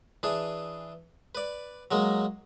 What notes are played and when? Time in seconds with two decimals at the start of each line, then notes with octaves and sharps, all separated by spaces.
0.23 E3 D4 G#4
1.35 B4 D5
1.91 F#3 G#3 A#3